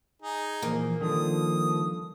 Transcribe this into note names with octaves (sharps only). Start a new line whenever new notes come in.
D#4 G#4
A#2 E3 F3 A#3
D#3 F3 G3 D4 A4 D#6